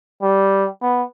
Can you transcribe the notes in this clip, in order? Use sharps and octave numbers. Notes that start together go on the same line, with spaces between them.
G3
B3